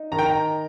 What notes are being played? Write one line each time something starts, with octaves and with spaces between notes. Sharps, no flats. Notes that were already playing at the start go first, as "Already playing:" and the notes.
Already playing: D#4
D#3 A#5
G5
A#5